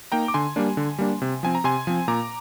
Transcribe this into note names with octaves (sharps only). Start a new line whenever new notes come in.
A#3 D#4 G5 A#5
D6
D3 G#5 C6
G3 A#3 D4
D3
G3 A#3 D4
C3
F3 C4 G#5
A#5
C3 G#5 C6
F3 C4
A#2 A#5 D6